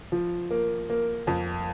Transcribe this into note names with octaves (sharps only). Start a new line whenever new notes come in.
F3
A#3
A#3
F2